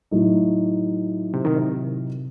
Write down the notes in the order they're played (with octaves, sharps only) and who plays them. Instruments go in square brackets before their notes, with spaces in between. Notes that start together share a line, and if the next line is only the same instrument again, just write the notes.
[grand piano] A2 F#3 A3 D#4
[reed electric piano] C3
D#3
C3